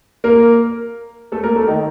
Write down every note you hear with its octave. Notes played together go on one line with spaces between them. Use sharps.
A#3 A#4
A3 A4
A#3 A#4
A3 A4
D#3 D#4